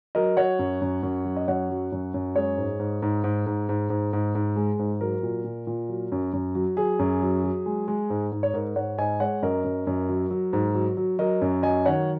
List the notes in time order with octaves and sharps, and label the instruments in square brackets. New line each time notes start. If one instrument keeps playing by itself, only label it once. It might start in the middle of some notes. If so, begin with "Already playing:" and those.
[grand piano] F#3 A#4 D#5
F#3 C#5 F#5
F#2
F#2
F#2
F#3
D#5
F#2 C#5 F#5
F#3
F#2
F#2
G#3 G#4 C#5
G#2
G#2
G#2
G#2
G#2
G#2
G#2
G#2
G#2
G#3
G#2
F#3 A#4
A#2
A#2
A#2
F#3
F#2
F#2
F#3
F#3 G#4
F#2
F#3
F#3
G#3
G#3
G#2
G#2
C#5
G#2 A#4
G#2 C#5 F#5
G#2 D#5 G#5
G#3 C#5 F#5
F#2 A#4 D#5
F#2
F#2
F#3
F#3
G#2
F#3
F#3
F#3 A#4 D#5
F#2
F#3 D#5 G#5
D#3 C#5 F#5